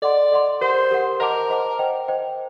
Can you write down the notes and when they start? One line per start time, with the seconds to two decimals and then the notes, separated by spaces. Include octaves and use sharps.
0.02 A4 D5 D#5 F#5 C6
0.32 A4 D#5 F#5 C6
0.61 G4 A#4 C5 F#5
0.91 G4 A#4 F#5
1.20 A#4 C5 D#5 F#5 A5 D6
1.50 C5 D#5 F#5 A5 D6
1.79 C5 D#5 G5
2.08 C5 D#5 G5